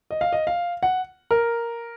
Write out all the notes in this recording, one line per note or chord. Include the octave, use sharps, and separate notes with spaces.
D#5
F5
D#5
F5
F#5
A#4